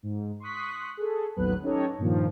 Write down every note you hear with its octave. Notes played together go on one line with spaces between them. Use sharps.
G#2
C6 C#6 D#6 F#6 B6
G#4 A4
A1 D#2 F#3 B3 B4 F#6
C#4 D#4 G4 A4 C#5 D#5
G2 A#2 D#3 F3